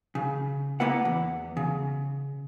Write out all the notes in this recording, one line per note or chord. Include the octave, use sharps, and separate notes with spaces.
C#3
A#3 B3 E4 B4 F#5
E2
C#3